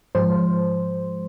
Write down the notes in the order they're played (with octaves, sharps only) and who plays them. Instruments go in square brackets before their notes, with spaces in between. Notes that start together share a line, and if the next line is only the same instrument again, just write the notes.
[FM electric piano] G#2 F3 G#3 C5